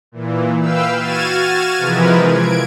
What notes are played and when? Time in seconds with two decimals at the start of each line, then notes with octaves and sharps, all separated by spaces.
0.12 A#2 E3
0.59 B4 F5 G5 E6
0.96 F#4 F6 G#6 A6 D#7 E7
1.78 C3 E3 F3 G#3 A#4 B4
2.30 G#6 D7